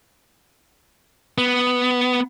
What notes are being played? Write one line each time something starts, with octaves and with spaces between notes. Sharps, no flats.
B3